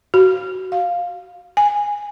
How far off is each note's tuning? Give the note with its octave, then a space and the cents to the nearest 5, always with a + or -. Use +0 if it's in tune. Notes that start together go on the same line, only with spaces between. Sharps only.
F#4 +20
F5 +10
G#5 -10